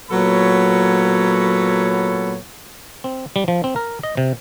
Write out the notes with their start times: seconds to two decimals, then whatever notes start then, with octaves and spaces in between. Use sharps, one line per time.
0.11 A#2 F#3 B3 A4 C#5 B5
3.04 C4
3.36 G3
3.48 F3
3.64 C4
3.76 A#4
4.03 D#5
4.17 C3